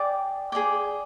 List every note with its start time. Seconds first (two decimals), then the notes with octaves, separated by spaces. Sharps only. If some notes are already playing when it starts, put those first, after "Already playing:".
Already playing: G#4 D5 G5 D6
0.52 G#4 D5 G5 D6